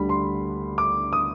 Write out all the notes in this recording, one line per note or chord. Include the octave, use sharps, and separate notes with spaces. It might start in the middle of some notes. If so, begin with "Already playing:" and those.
Already playing: D2 D3 G3 B5
C6
D6
D#6